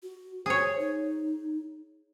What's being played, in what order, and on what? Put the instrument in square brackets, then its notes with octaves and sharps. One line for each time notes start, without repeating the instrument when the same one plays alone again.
[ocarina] F#4
[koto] G#4 C#5 [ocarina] C5
[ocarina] D#4